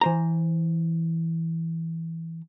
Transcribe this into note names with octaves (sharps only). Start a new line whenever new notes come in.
E3 C5 A#5